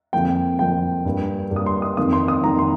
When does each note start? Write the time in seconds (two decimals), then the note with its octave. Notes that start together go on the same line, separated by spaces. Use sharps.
0.13 F2 F3 A#3 G5
0.59 F2 F3 A#3 G5
1.05 G2 G3 A#3
1.51 G2 G3 A#3
1.56 D#6
1.66 C6
1.82 D#6
1.97 F2 D#3 A#3 D#6
2.13 C6
2.28 D#6
2.44 F2 D#3 A#3 A#5
2.59 C6